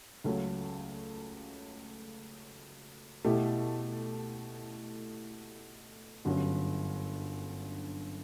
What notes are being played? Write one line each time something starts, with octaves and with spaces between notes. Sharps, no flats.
C#2 C#3 F#3 A3
B2 A3 E4 G4
G1 F#2 D3 F#3